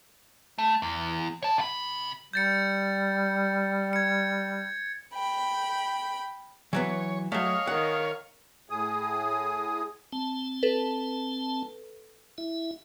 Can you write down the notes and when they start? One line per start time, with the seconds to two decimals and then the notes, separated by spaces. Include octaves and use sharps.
0.58 A3
0.82 E2
1.43 C#5 A5
1.58 C3 B5
2.33 G3 G6 A6 C#7
3.93 G#6 C#7
5.14 G5 B5
6.73 E3 F#3 B3 C#5
7.32 F#3 A3 G#4 C#5 D#5 F5
7.67 D#3 F#5
8.70 A2 G#4 D#6
10.13 C4 A5
10.63 A4 B4
12.38 E4 E5